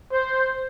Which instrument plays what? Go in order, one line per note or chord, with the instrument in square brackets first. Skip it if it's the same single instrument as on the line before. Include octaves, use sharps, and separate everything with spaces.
[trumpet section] C5